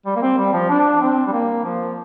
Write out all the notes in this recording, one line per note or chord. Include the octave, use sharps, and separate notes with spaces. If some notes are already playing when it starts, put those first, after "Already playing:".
G3
A#3
C4
G3
F3
D4
C4
G3
A#3
F3